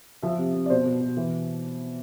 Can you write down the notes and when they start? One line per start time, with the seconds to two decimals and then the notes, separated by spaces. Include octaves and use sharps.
0.23 F3 E5
0.38 C3
0.54 C3
0.66 D5
0.70 B2 C5
0.86 B2
1.01 B2
1.17 E3